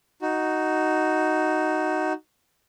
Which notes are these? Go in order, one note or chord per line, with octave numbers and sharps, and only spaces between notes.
D#4 F#4